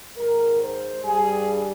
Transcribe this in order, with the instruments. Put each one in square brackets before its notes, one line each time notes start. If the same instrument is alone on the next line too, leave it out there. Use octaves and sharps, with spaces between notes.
[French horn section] G#2 D#3 G#3 A#4
C5
G2 G3 G#4